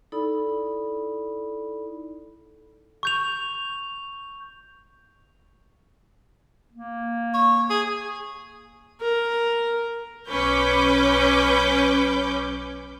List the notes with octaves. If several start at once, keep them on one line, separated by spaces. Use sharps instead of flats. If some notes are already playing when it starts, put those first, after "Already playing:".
D#4 E4 A4 D5 B5
C#6 G6 F7
A#3
C#5
G#4
A#4
B1 C#4 B4 D6 G6